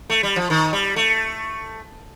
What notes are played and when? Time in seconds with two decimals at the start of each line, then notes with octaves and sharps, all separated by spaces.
0.10 A3
0.23 G3
0.36 F3
0.50 D#3
0.73 G3
0.96 A3